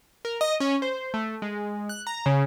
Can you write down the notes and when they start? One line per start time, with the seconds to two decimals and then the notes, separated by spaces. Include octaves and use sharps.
0.25 A#4
0.41 D#5
0.60 C#4
0.82 C5
1.14 A3
1.42 G#3
1.89 F#6
2.07 A#5
2.26 C#3